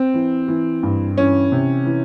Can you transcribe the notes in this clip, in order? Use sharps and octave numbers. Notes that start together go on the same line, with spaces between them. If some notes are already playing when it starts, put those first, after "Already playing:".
Already playing: C4
E3
E3
G2
E3 C#4
C3
E3